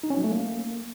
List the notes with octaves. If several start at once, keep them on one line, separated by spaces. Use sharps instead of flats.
D#4
C#4
F#3
A3
A#3